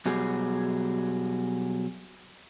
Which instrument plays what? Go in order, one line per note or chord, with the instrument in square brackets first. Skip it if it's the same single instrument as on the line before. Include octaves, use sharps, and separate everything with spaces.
[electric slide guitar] B2 F#3 G3 G#4